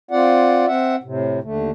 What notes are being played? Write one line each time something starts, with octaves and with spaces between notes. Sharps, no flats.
C4 F4 D5 F#5
C4 E5 F#5
A2 C3
D#2 D3 A3